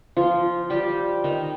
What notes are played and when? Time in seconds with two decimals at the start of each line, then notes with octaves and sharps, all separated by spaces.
0.17 F3 F4
0.70 G3 G4
1.24 D#3 D#4